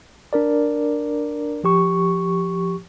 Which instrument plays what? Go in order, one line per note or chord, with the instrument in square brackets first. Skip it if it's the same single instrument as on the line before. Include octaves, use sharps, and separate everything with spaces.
[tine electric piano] D4 A#4 D5
F3 G4 C#6